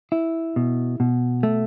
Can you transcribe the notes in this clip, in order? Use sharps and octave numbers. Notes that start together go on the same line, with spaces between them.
E4
B2
B2
A3